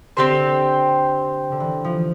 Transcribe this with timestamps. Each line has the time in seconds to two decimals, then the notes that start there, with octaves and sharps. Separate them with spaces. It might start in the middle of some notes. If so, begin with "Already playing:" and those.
0.17 D3 C4 G4 C5
1.52 D3
1.60 E3
1.84 F3